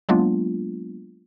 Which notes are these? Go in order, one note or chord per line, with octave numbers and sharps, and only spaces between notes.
F#3 G#3 A#3 B3 D4 F4